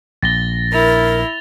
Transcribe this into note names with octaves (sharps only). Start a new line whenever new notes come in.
A#1 A6 A#6 G7
E4 A#4 A#6 F7